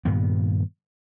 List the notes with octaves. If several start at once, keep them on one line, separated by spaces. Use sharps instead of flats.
G2 A#2 D#3 B3